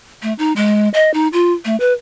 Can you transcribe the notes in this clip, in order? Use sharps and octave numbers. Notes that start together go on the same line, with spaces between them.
A3
D#4
G#3
D#5
D#4
F4
A3
B4